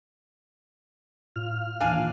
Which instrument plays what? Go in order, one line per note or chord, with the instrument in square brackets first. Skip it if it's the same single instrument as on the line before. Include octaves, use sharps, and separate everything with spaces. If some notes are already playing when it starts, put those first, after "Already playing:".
[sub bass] A2 [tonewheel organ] F4 F6
[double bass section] D#2 A#2 E3 [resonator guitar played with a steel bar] D4 F5 G#5